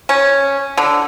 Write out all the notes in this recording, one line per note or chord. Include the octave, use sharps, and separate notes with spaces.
C#4
D3